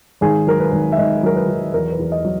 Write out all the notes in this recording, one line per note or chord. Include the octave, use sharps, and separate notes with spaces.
G#1 G#4
F#3 A#4
B4
G#1
E5
G#1 D#5
F#3 A#4
B4
F#3
E2 A#4
B4
E2
D#5
F#3